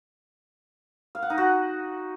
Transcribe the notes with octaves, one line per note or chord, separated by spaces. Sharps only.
F5
F#5
D#4
F#4